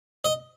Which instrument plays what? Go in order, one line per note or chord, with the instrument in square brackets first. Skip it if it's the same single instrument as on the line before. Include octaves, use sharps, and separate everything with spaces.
[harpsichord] D#5